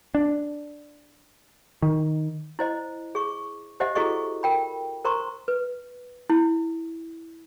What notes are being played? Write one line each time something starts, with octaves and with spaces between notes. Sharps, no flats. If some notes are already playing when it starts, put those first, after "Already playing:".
D4
D#3
E4 C5 D#5
G#4 C#6
G4 C5 D#5 E5 F#5
E4 F#4 G#4 A4 D#5 C#6
A#4 G5 B5
A#4 C5 A#5 C6 C#6
B4
E4